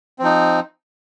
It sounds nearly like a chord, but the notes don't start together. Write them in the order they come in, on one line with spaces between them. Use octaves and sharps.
C4 F3 D#4